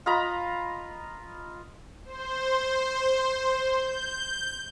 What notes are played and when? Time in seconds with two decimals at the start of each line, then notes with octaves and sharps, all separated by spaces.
0.06 F4 D#5 A#5 B5
2.05 C5
3.71 G6